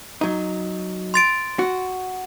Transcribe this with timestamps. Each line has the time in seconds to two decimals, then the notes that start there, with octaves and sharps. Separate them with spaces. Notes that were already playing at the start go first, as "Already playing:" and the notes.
0.21 F#3 D#4
1.14 C6 A6 D7
1.59 F#4